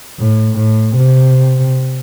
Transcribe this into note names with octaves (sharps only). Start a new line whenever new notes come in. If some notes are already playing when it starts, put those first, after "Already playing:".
A2
A2
C3